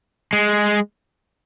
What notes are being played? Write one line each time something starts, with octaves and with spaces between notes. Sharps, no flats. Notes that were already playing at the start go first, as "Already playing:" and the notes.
G#3